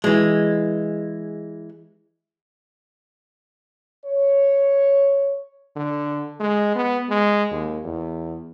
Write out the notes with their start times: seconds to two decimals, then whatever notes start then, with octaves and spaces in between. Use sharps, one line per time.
0.04 E3 G#3
4.05 C#5
5.76 D3
6.40 G#3
6.76 B3
7.09 G#3
7.51 D#2
7.84 E2